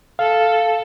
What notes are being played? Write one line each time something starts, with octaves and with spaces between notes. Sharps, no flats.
A4 F5